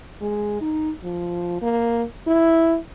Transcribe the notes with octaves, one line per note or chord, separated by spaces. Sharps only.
G#3
D#4
F3
A#3
E4